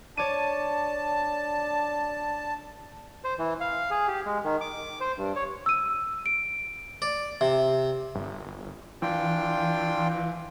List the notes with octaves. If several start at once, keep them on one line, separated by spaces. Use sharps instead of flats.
D4 C#5 A5 D6 D#7
C5
E3
F5
G#4
G4
G#3
D#3
D6
C5
G2
C#5
E6 D#7
D7
D5
C3 E5
G1
E3 D4 F4 G5